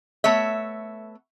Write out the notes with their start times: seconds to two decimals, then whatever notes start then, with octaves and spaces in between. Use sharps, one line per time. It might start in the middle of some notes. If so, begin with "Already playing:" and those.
0.24 A3 B3 C#5 E5